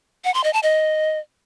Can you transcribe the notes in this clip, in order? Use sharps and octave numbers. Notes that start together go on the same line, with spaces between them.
F#5
C6
D#5
A5
D#5